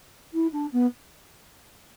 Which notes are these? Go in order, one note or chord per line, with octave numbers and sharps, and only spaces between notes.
E4
D4
B3